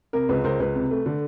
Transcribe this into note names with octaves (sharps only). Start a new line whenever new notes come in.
C3 A#4
C#2 B4
C#2 A#4 C5
C#2 B4
C3
A3
D3